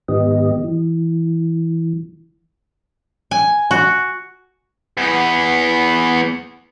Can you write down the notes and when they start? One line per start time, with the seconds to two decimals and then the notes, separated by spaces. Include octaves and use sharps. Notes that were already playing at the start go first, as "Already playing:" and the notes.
0.08 G#2 D#3 B3 G4 D#5
0.64 E3
3.31 G#5
3.71 F#4
4.98 E2 B3